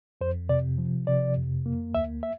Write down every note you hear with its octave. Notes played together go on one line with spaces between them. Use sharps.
F2 C5
C3 D5
F3
C3 D5
F2
A#3
D2 E5
E5